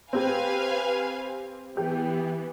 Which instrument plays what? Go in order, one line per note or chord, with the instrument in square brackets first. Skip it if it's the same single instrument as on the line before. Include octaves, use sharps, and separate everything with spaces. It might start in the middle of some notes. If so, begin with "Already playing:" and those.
[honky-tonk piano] C4 G4 [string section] B4 F5 G#5
[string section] E3 B3 [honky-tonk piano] G4